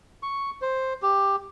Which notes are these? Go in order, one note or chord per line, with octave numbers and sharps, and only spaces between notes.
C#6
C5
G4